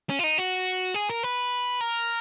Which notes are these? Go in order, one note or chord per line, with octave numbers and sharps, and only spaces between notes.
C#4
F4
D#4
F#4
G#4
A#4
B4
A#4